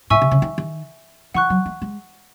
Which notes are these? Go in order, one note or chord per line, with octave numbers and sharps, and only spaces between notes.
A2 E5 G#5 C#6 E6
C3
C#3
D#3
D#3
E3 F#5 C#6 F#6
F#3
A3
G#3